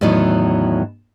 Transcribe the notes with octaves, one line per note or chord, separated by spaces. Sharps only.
E2 A2 D#3 E3 F#3